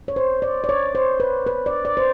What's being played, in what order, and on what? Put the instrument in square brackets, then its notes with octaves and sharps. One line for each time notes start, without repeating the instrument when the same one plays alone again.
[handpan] C#5
C5
D5
D5
C#5
C5
B4
B4
D5
D5
C5